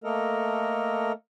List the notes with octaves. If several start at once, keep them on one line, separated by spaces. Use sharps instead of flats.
A3 A#3 A4 A#4 D#5